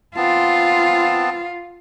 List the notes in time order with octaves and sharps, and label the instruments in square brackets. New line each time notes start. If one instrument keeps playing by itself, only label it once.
[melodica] B3 C4 A5 [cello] F4